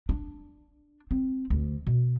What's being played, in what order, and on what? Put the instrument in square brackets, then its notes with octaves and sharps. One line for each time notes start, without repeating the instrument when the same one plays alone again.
[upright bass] D4
C4
D2
B2